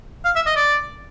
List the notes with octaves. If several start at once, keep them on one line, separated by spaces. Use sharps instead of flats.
F5
E5
D#5
D5